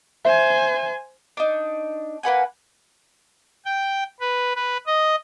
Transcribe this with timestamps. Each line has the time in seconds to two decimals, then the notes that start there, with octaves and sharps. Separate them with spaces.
0.25 C5 E5 G#5
1.37 D4 D#4
2.23 A#3 B4 F#5 G#5
3.66 G5
4.20 B4
4.55 B4
4.86 D#5